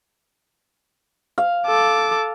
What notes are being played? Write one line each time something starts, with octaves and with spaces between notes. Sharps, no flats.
F5
A4 D6